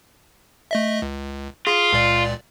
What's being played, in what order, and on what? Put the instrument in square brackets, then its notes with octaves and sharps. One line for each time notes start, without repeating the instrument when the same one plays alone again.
[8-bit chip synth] A3 D#5 E5
C#2
[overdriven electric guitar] F4 [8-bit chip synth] G#4
[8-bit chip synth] C#2 A#2 D5